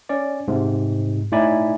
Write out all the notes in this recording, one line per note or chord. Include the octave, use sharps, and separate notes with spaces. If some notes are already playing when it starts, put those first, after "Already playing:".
C#4 D5
G#2 C3
A2 D#4 E4 D5 G#5 B5